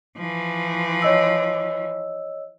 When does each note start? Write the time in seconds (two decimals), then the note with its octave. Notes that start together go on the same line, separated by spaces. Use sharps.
0.17 E3 F3
1.02 C#5 D#5 E6